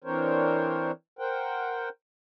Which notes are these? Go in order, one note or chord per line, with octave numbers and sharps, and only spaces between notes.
E3 C4 D4 A#4 C5 C#5
A#4 C5 F#5 G5